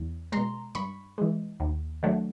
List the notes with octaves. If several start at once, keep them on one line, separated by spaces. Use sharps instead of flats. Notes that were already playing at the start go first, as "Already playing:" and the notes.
Already playing: E2
B2 G#3 A#5 C6
G2 B5 C#6
E3 G#3
D#2
D#3 F#3 A3 D4